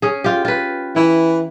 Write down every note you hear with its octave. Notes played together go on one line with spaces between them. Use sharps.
C#4 G#4
F4 G4
F4 B4
E3 E4